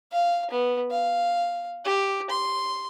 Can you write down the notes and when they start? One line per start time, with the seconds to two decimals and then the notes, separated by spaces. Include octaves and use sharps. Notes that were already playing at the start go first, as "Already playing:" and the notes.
0.12 F5
0.51 B3
0.91 F5
1.85 G4
2.30 C6